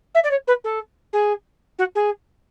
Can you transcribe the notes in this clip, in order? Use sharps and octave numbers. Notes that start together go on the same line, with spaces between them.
E5
D5
C#5
B4
A4
G#4
F#4
G#4